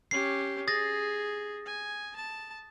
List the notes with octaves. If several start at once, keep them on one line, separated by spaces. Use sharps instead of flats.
C#4 G4 C7
G#4 D#6 A6 A#6
G#5
A5